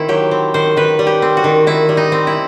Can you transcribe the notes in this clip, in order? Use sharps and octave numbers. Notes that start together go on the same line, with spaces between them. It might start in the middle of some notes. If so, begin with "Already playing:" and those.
Already playing: D#3 C4 E4
F#3 G4
C4
D#3 C5
D#3 B4
G3
G4
C4
F#4
D#3
D#3 E4
G3
D#4
C4
E4